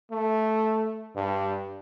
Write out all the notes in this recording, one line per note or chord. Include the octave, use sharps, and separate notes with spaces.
A3
G2